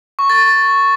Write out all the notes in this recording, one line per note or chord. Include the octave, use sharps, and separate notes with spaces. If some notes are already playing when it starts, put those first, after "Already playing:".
C#6
A6
A6